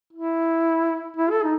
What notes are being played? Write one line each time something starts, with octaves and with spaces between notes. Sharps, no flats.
E4
E4
A4
D#4